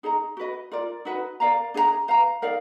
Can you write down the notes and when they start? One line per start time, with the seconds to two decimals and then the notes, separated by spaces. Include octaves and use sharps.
0.03 D#4 G#4 D#5 A#5
0.37 F#4 B4 D#5
0.72 F4 A#4 D5
1.05 D#4 F#4 B4 D#5
1.40 A#4 D5 F5 A#5
1.74 D4 G#4 D#5 A#5
2.08 B4 F5 A#5
2.42 D#4 A#4 D5 F5